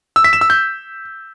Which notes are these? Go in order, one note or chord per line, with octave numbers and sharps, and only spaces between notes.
E6
B6
E7
E6
G6